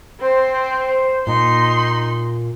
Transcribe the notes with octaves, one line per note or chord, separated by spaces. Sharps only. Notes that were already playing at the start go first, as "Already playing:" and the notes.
C4 C5
A#2 D#4 C6